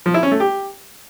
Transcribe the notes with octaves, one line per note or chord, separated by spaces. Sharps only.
F3
E4
C#4
A3
G4